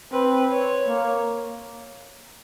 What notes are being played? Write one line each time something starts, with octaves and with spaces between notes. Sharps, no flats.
C4 B4
C#5
A#3